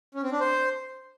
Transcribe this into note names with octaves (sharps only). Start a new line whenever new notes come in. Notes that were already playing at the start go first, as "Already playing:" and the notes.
C#4
C4
D4
C5